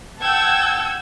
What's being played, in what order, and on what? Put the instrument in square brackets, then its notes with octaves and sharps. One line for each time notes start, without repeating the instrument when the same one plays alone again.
[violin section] F#5 G5 A5 E6 G6 G#6